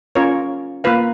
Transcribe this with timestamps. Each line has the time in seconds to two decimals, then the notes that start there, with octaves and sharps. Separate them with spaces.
0.15 C#4 F4 A#4 C#5
0.84 A#3 F4 B4 F5